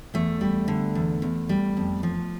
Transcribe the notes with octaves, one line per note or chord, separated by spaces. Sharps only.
E2 A3
G3
D3
E2
E2
G3
F2
F3